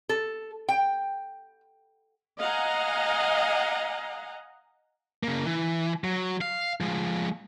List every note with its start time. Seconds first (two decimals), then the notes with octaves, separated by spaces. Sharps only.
0.09 A4
0.69 G5
2.40 D#5 F5 F#5 G#5 A#5
5.23 C#3 A#3
5.45 E3
6.04 F#3
6.41 F5
6.81 F3 G#3